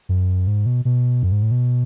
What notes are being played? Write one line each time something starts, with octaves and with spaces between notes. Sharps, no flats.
F#2
G#2
B2
B2
F#2
G#2
A2
B2